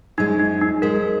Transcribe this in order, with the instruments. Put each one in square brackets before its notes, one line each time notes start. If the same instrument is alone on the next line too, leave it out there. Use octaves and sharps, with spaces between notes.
[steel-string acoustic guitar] F#2 F3 G#3 [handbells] D#4
[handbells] D#4
D#4
[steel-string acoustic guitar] F#2 F3 G#3 [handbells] A#4